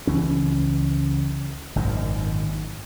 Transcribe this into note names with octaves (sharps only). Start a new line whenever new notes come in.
C#2 E3 C#4
G#1 F#2 A#2 D#3